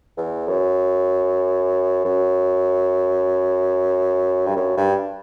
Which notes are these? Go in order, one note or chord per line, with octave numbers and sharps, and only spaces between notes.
E2
F#2
F#2
G2
F#2
G2